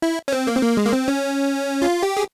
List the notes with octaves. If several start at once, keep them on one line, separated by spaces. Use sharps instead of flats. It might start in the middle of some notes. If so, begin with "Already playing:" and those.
E4
C#4
C4
A#3
C4
A#3
G#3
A#3
C4
C#4
F4
G4
G#4